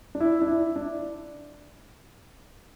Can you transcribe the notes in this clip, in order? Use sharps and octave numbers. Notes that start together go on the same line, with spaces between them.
D4
E4
D4
E4
D4